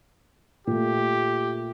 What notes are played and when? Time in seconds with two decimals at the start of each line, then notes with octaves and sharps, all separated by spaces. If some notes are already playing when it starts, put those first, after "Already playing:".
0.67 A#2 A3 G4